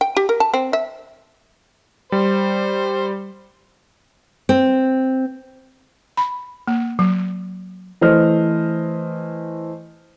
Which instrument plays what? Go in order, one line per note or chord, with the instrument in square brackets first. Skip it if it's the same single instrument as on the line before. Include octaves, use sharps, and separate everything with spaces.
[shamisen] G5
G4
A#4
A5
C4
E5
[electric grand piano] G3 [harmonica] C5
[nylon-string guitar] C4
[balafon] B5
A#3
F#3
[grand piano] E3 A3 C5 D#5 F6